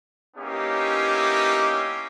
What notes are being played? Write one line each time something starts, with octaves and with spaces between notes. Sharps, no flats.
A#3 B3 C#4 D#4 E4 G4